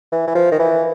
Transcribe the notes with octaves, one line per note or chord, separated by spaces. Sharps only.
E3
E3
F3
D#3
E3